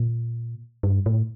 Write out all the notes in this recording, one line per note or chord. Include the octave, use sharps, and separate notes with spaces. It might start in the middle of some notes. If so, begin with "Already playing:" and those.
Already playing: A#2
G2
A2